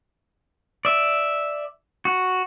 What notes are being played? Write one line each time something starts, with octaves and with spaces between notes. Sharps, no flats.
D5 E5
F#4